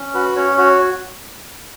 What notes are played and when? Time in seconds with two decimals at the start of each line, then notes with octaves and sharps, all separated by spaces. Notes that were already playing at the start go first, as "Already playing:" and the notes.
Already playing: C#4
0.14 F#4 B4
0.36 C#4 C#5
0.58 F#4 C#5